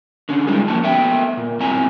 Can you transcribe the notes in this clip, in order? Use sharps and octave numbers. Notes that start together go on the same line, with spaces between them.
D3 C#4
G3 G#3 D#4 F4 G#4
E2 F3 A#3 C#4 A5
A3 B3 E5 G5
A#2
G2 B2 C4 E4 G#5 A#5